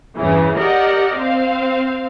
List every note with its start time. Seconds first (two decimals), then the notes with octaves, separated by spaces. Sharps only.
0.17 E2 G2 C#3 E3
0.57 G4 A#4 D5 D#5 F#5
1.17 C4 F5